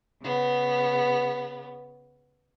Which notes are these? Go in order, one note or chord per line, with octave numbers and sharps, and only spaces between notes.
C#3 B3